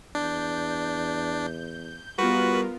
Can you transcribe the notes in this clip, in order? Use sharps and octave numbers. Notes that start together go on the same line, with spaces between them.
E2 D4 G6
G3 B3 F4 F#4 A#4 B4